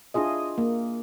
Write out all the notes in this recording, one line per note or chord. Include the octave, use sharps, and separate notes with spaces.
D4 E4 F4 G#4 D#5
A#3